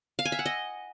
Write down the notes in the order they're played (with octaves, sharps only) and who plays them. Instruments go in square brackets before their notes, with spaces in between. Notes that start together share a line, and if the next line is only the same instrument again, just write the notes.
[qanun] F5
G#5
E5
F#5
D#5